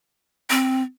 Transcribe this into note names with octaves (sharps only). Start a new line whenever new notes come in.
C4